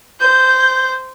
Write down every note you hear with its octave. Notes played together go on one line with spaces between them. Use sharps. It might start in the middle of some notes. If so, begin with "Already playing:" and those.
C5 G6